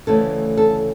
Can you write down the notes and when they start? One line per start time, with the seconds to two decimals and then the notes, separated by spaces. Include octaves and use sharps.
0.07 D2 C#3 E3 A3 A4
0.57 A4